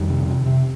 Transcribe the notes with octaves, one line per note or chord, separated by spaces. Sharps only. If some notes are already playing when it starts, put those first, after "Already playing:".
Already playing: F2 D#3 G3
C3
C3
C3